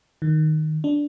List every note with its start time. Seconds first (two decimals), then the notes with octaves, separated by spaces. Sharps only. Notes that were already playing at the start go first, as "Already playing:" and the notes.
0.22 D#3
0.84 D4